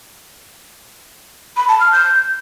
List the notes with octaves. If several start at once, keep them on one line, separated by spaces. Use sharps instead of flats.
B5
A5
F6
G6